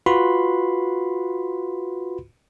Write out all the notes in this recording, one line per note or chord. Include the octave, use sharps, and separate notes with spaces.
F4 F#4 B4 B5 C6